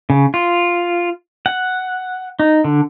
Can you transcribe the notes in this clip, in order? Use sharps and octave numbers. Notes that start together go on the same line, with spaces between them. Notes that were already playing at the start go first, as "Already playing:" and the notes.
C#3
F4
F#5
D#4
D3